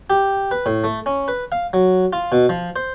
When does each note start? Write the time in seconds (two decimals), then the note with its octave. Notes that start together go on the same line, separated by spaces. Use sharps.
0.10 G4
0.51 B4
0.66 A2
0.84 A3
1.06 C#4
1.28 B4
1.52 F5
1.73 F#3
2.13 F4
2.32 B2
2.49 F3
2.76 C5